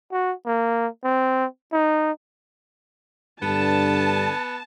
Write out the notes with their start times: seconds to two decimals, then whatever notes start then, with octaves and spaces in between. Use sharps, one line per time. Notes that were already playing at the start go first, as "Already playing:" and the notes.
0.12 F#4
0.45 A#3
1.04 C4
1.72 D#4
3.42 G2 D3 B3 A5